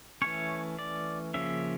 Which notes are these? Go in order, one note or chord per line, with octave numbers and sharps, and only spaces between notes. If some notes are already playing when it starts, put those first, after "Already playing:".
E3 A3 C#4 C#5
D5
C#3 F3 A#3 C#4 E5